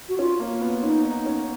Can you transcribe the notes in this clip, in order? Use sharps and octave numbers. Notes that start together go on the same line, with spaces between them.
F#4
C#4 F4
A#3
B3
C#4 D#4
D#4
C#4